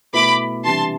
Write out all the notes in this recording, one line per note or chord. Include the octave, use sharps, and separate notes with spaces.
B2 A3 E4 B4 B5 D6
C3 E3 G3 D4 A5 C6